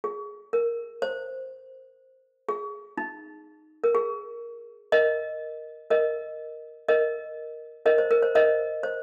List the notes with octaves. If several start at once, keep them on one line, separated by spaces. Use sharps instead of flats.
G#4
A#4
C5
G#4
D#4
A#4
G#4
A#4 D#5
A#4 D#5
A#4 D#5
A#4 D#5
C5
A#4
C5
A#4 D#5
C5